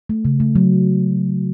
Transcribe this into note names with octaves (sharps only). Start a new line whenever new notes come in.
A3
C#3
A3
F#3